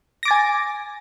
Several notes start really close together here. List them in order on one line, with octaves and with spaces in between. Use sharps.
A#6 D6 A6 G#5